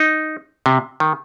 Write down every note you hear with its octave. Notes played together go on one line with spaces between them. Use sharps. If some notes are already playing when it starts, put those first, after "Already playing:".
Already playing: D#4
C3
D#3